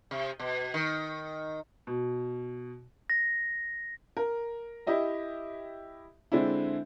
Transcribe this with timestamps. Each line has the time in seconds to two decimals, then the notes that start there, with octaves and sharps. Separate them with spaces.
0.11 C3
0.39 B2
0.74 D#3
1.87 B2
3.10 A#6
4.17 A#4
4.87 E4 G4 D#5 E5
6.32 D3 G#3 C4 D4 E4